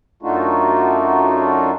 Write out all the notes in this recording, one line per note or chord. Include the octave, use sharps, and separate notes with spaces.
F#2 A3 D4 D#4 F4 F#4